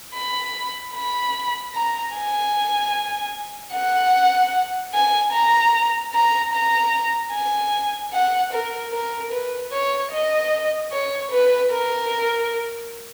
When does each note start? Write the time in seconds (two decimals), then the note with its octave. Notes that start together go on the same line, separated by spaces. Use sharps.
0.15 B5
0.95 B5
1.74 A#5
2.14 G#5
3.73 F#5
4.94 G#5
5.33 A#5
6.14 A#5
6.53 A#5
7.33 G#5
8.13 F#5
8.52 A#4
8.93 A#4
9.32 B4
9.72 C#5
10.12 D#5
10.92 C#5
11.31 B4
11.71 A#4